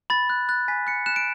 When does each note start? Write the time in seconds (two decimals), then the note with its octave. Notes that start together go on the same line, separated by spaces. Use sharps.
0.10 B5 A6
0.30 F#6
0.49 F#6 A6
0.68 G#5 B6
0.87 F#6 C#7
1.06 F#6 E7
1.16 D7